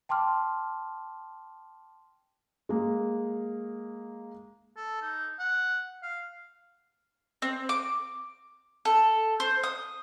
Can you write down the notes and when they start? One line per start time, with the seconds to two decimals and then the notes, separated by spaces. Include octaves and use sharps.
0.09 G5 A5 C6 D6 F6
2.69 G#3 A#3
4.77 A4
5.02 D#4
5.39 F#5
6.03 F5
7.42 C4
7.69 D6
8.85 A4
9.40 C5
9.63 D#6